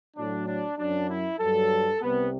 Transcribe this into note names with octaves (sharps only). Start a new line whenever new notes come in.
A2 F#3 D4
D4
F#2 F#3 D4
E4
G2 F#3 A4
C2 C3 G3 B3